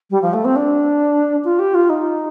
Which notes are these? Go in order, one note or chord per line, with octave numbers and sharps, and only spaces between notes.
G3
F3
A3
C4
D4
F4
G4
F4
D#4